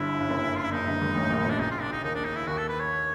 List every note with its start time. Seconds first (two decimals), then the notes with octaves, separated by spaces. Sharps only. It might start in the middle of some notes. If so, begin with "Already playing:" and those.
Already playing: G1 G2 E4
0.21 G2
0.28 F#1 F#2
0.56 F4
0.64 E4
0.72 F#1 F#2 D#4
0.87 G1 G2
1.01 G#1 G#2
1.16 A1 A2
1.30 A#1 A#2
1.45 B1 B2
1.50 D4
1.59 C#2 C#3 D#4
1.71 F4
1.82 D4
1.92 D#4
2.03 D#2 D#3 D#4
2.15 D4
2.25 D#4
2.36 E4
2.47 D#2 D#3 F#4
2.58 A4
2.68 B4
2.80 C#5